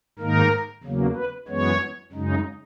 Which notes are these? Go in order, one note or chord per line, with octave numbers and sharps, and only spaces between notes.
G#2 D#3 A#3 D#4 A#4
E2 C#3 F#3 A#3
B4
F#2 E3 G#3 B3 C#5
F#2 C#3 G#3 D#4